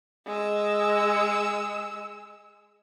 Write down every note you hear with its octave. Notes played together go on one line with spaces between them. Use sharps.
G#3 E6